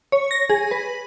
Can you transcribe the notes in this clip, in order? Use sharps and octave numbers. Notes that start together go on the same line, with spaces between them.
C#5
A#6
G#4
B4